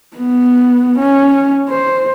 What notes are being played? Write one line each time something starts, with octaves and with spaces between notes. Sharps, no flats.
B3
C#4
C5